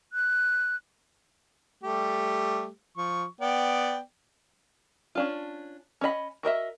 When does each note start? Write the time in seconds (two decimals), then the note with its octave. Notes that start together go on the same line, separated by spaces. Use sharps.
0.13 F#6
1.84 G3 A3 G4
2.97 F3 C#6
3.41 B3 D5 G5
5.15 C#4 D4 F4
6.01 C#4 D4 D#5 B5
6.43 F#4 A#4 D#5 E5